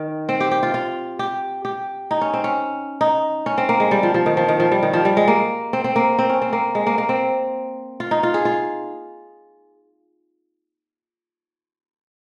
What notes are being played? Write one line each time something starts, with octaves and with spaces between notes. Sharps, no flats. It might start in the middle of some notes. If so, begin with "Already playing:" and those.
Already playing: D#3
C4
G4
G4
F4
F4
G4
G4
D#4
C#4
C4
C#4
D#4
C#4
C4
A#3
G#3
G3
F3
F3
D#3
F3
D#3
F3
G3
D#3
F3
G3
G#3
A#3
C4
C4
A#3
C4
C#4
C4
A#3
G#3
A#3
A#3
C4
F4
D#4
F4
G#4
F4